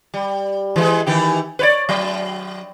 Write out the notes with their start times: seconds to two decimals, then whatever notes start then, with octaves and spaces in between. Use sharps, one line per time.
0.14 G3
0.76 E3 G#3
1.07 D#3 E3 G4
1.59 B4 C#5 D5
1.89 F#3